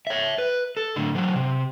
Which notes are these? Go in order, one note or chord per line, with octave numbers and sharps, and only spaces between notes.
C#5 E5
B4
A4
A2 D3
E3 F#3
C3